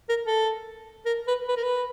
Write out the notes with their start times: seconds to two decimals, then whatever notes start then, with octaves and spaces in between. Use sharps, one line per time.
0.09 A#4
0.26 A4
1.06 A#4
1.27 B4
1.48 B4
1.56 A#4
1.63 B4